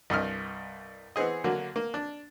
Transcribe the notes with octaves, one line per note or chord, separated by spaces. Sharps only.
C2 G2 D#5 F6
E3 B3 C4 G#4 D#5
D3 F#3 A#3
A#3
D4